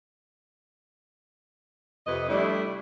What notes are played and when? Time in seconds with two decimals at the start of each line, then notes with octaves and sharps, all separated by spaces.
2.07 F2 C3 B4 D#5
2.29 G3 A3 D4 E4